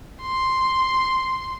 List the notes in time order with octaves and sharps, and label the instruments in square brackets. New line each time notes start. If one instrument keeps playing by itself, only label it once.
[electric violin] C6